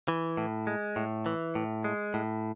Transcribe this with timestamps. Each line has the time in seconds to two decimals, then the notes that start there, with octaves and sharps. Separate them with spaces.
0.08 E3
0.37 A2
0.67 G#3
0.96 A2
1.26 E3
1.55 A2
1.84 G#3
2.14 A2